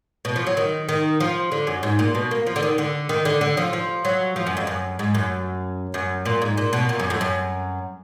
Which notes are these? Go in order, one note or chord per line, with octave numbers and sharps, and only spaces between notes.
B2
F3
F#3
D#3
D#3
F3
D3
F#2
G#2
A#2
B2
A#3
F3
D3
D#3
D3
D#3
D3
D3
F3
F3
F#3
F3
F#2
F2
F#2
G#2
F#2
F#2
A#2
G#2
A#2
B2
A#2
F#2
F2
F#2